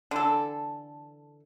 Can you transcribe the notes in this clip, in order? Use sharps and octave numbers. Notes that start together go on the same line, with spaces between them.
D3 E3 A4